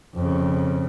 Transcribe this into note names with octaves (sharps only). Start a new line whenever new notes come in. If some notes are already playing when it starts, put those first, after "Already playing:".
F2 C#3